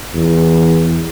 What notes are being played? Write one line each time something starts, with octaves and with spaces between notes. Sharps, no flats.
E2